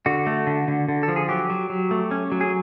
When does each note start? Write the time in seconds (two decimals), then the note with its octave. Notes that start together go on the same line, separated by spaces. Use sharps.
0.06 D3 F#4
0.27 A3
0.47 D3
0.68 D3
0.88 D3
1.03 A4
1.08 F3
1.16 G#4
1.29 F#3 G4
1.50 F#3
1.70 F#3
1.91 A3
2.11 C#4
2.32 F#3
2.41 G#4